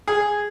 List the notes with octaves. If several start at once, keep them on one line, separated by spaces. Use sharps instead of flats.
G#4